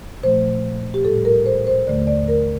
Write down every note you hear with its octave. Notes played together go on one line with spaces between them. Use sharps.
A#2 F3 A3 C5
G4
A2 G3 A4
A#4
C5
C5
D#2 D3 A3 D5
D5
A#4